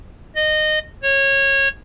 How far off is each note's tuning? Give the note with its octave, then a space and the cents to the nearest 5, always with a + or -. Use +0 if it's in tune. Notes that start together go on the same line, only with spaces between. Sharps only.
D#5 -20
C#5 -20